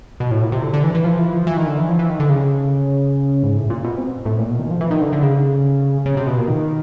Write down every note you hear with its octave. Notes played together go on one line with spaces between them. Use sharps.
B2
A2
A#2
C3
D3
D3
E3
E3
F3
E3
F3
E3
D#3
D3
E3
F3
E3
D#3
D3
C#3
G#2
A2
A#2
B2
C3
A2
A#2
B2
D#3
F3
E3
D#3
D3
D3
C#3
C#3
C3
B2
A#2
D#3